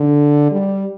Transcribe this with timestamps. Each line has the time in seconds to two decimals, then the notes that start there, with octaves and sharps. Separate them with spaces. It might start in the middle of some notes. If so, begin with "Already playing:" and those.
Already playing: D3
0.51 G3